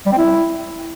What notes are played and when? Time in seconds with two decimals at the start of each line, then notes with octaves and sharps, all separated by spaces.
0.06 G3
0.12 C4
0.18 E4